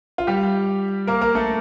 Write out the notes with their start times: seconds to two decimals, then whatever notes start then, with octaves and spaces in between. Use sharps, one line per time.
0.18 F4
0.27 G3 G4
1.07 A#3 A#4
1.22 A#3 A#4
1.35 A3 A4